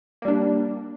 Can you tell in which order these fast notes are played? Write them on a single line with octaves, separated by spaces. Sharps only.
A#3 G3 D4